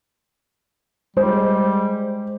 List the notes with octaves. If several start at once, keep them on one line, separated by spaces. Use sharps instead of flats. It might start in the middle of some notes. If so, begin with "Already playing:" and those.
G3 G#3 C5